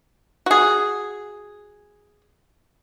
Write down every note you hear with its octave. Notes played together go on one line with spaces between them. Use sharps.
F#4 G#4